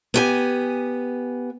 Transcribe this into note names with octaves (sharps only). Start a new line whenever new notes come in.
B3 G4 G#5